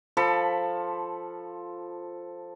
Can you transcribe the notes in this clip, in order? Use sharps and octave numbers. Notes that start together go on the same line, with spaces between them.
F3 A4 B5